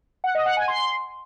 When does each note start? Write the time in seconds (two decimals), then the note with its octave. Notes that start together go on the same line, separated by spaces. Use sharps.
0.24 F#5
0.35 D#5
0.46 F#5
0.57 G#5
0.68 C6